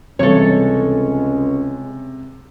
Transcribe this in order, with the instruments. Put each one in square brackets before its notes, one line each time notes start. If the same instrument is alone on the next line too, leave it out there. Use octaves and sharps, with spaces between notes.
[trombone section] C#2 G#3 C#4 [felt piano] C3 [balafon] E3 G3 [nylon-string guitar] A4 C#5